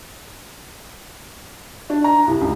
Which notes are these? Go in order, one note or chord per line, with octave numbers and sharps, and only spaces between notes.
D4
A#5
C2
C#2